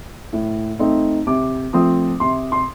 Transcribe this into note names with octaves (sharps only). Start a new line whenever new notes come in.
A2
A3 C4 D#4
C3 D6
F3 A3 C4 D#6
C3 C6
C6